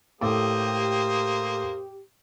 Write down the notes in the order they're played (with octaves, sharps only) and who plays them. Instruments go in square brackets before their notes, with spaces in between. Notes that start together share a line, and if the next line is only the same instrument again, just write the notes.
[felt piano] A2 A4 D6 [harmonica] A#3 C5 D#6 [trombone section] G4